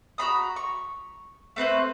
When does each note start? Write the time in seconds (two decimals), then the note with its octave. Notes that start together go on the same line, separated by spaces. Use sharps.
0.18 F#4 A#5 B5 D#6
0.56 C#6
1.56 A3 C4 B4 C5